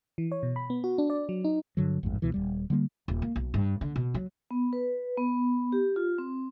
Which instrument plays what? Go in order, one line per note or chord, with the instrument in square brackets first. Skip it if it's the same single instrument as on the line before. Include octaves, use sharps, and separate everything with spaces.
[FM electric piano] E3
C#5
B2
B5
B3
F#4
D4
D5
F#3
D#4
[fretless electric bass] G2 D3 F#3
A1 F2 G#2
C#2 B2 E3
D#1 G3
D3 G3 G#3 A#3
[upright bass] D#1
A#3
B1
G2
D3
B2
F#3
[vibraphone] B3
B4
B3
G4
F4
C4